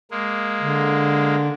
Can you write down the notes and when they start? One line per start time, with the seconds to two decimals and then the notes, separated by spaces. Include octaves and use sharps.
0.11 G#3 A#3
0.62 D3